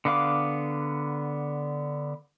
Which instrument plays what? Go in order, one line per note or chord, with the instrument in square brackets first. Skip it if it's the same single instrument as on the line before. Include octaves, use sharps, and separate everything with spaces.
[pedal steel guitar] D3 B3 F5 D6